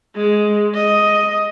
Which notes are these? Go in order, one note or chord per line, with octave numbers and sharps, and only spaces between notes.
G#3
D#5